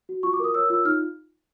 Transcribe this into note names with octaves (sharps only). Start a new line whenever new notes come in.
F#4
F4 C#6
D6
A#4 D#6
C#5 E6
F4 E6
D#4 F6